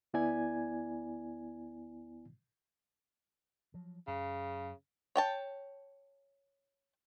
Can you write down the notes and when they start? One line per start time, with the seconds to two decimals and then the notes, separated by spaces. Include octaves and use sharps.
0.14 D2 B3 E4 D5 G#5 G#6
3.74 F3 F#3
4.07 F#2 C#3
5.16 C#5 G5 A5